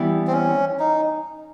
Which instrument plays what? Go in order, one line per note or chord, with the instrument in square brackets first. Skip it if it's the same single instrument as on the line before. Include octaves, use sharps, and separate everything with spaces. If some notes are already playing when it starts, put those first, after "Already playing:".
Already playing: [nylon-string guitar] E3 G3 B3 E4 G4
[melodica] C4
C#4
D#4